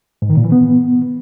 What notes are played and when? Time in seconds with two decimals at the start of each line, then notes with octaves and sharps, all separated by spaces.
0.22 G#2
0.30 D#3
0.37 A#2
0.45 E3
0.52 B3